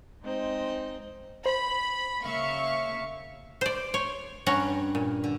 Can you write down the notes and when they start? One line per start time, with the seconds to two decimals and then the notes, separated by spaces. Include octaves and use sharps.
0.23 G#3 C4 D#4 D#5
1.46 C5 B5
2.22 C#3 A#3 E5 F5 C#6
3.61 C5 D5
3.94 C#5 C6
4.46 G2 C#4 F#5 A#5
4.95 A#2
5.24 D3